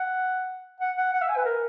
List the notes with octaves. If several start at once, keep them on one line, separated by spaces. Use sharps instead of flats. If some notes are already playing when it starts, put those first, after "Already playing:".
Already playing: F#5
F#5
F#5
F#5
E5
G#5
B4
A#4